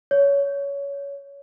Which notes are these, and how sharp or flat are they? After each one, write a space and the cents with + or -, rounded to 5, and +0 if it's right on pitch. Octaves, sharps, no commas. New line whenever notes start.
C#5 +20